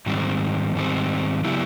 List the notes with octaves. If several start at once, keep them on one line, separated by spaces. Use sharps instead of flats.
G#2 D#3 G3 C4
G#2 D#3 G3 C4
C#3 F#3 B3 E4 G4